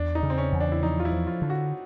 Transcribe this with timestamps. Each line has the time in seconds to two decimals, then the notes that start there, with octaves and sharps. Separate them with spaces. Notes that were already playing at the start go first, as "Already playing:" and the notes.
Already playing: E2 D4
0.15 D#4
0.23 C#3
0.30 C4
0.38 C#4
0.52 E2
0.60 D4
0.72 E4
0.83 F3 D#4
1.00 F4
1.05 E4
1.12 F3
1.27 F4
1.42 D3
1.50 F#4